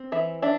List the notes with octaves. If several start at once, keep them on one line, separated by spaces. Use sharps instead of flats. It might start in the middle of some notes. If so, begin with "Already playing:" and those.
Already playing: C4
E3 E5
D4 E5